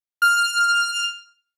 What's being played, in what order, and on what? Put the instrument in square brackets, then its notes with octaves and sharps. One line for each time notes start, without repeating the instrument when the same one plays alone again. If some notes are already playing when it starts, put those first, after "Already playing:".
[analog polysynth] F6